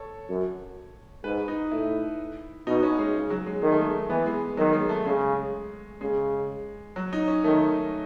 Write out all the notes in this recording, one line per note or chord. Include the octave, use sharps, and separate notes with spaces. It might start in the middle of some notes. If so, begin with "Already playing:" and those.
Already playing: A4 C#5
F#2
G#2 B4
D#4
A2 E4
B2 D#4
C#4
G#3
C#3
F#3
G#3
D#3 G#3
A3
G#3
E3 B3
G#3
D#3 F#3
G#3
A3
C#3 G#3
C#3 G#3
F#3
D#4
C#4
D#3 A3